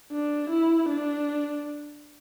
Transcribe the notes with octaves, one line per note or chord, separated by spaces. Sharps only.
D4
E4
D4